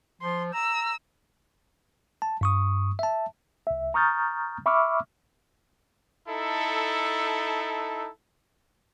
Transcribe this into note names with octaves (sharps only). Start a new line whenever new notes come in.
F3 C6
A#5 E6
A5
G2 C#6 D#6
E5 A5
C2 E5
A#5 C#6 D#6 F6 G6 A6
E5 B5 C#6 D6 E6 F6
D#4 E4 A4